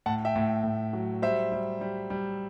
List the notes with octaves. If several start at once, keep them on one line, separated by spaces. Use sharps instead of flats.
A2 F#5 A5
E5 G5
A2
A2
F#3
G3 C5 E5
G3
G3
G3